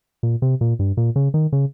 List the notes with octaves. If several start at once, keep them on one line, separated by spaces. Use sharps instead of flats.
A#2
C3
A#2
G2
A#2
C#3
D#3
C#3